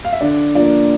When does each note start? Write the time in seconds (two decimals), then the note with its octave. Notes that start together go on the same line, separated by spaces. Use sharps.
0.05 F5
0.13 E5
0.21 D3 D4 D5
0.55 F3 A#3 D4 D5